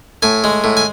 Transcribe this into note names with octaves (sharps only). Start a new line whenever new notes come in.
A2 G#5
G#3
A2
G#5